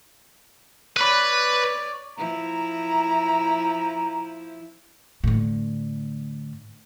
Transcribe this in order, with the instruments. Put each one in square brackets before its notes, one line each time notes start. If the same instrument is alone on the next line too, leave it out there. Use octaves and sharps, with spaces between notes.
[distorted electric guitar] B4 B5 [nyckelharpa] C#5 D5
[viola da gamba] F3 E4 [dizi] A#5
[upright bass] A2 D3